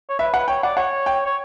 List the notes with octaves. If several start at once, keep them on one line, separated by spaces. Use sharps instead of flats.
C#5
B4 E5
B4 F#5
C#5 G5
D5 F#5
C#5 F#5
G5
C#5